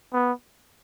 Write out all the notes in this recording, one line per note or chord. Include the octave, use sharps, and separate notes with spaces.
B3